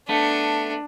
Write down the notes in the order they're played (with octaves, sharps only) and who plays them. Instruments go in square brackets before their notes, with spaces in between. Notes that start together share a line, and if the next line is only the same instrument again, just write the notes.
[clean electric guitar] A3 B3 [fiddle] D4